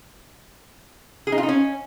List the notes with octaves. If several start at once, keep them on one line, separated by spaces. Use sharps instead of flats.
G#4
D#4
F4
D#4
C#4